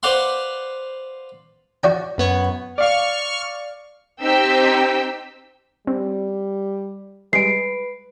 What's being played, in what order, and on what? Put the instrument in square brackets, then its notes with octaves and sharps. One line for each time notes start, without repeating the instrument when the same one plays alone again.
[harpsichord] B4 C5 D5 F5 F#5 C6
F#4 D5 G5
[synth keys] F#2 B3 C#5
[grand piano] D5 F5 [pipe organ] C#6 F6
[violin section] C4 D#4 G4 G5 E6 B6
[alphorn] G3 [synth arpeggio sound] C4
[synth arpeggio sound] G3 G#3 [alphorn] B4 [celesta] C7 D7